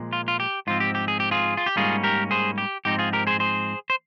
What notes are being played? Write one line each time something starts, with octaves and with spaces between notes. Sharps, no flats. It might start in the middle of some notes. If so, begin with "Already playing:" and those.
Already playing: A#2 F3 G#3
F4
F4
G4
G#2 F3 C4 F4
G4
G4
G#4
G4
F4 G#4
F4
G4
G#2 G3 A#3 C#4 F4 G#4
G4 A#4
G#4 C5
G4
G#2 F3 C4 D#4 G4
F4 G#4
G4 A#4
G#4 C5
G#4 C5
C5